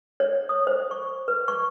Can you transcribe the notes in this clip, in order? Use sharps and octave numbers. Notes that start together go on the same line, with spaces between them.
C#5
D#6
C5
C#6
B4
C#6